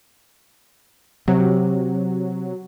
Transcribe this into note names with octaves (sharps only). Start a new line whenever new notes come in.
C3 F#3